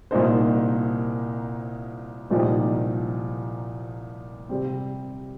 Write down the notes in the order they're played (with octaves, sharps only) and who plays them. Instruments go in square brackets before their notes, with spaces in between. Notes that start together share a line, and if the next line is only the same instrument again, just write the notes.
[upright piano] C2 A#2 A#3 D#4 C5
C2 A#2 F3 D#4 G4
C3 G3 C4